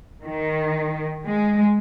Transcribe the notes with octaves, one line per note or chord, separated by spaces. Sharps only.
D#3
G#3